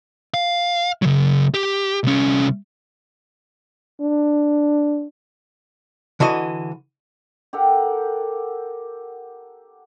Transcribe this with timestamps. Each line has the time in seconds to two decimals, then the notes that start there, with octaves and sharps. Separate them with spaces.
0.34 F5
1.02 C#3 F#3
1.54 G4
2.04 C2 C#4
4.01 D4
6.20 D3 E3 F#4 D#5
7.53 G4 A4 A#4 F#5